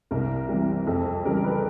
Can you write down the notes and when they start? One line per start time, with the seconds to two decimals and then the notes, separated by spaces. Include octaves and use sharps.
0.11 C2 A#4
0.49 C3 E3 G3
0.87 F2 A4
1.06 A4
1.25 C#3 E3 G3 A#4
1.44 B4